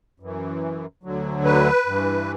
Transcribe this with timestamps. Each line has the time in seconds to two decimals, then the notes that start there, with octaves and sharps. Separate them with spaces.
0.20 F#2 E3
1.03 D2 D3 F#3
1.44 B4
1.86 G2 E3